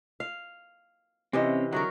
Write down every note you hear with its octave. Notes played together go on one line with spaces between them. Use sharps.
F5
C3 E3 C4 C#4 D#5
D3 F#3 D#4 F#4 A#4 F#6